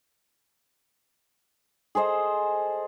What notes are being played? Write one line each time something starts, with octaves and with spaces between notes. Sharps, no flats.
G#4 A4 C5 D#5